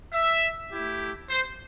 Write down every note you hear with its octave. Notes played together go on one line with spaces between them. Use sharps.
E5
A3 E4 G4
C5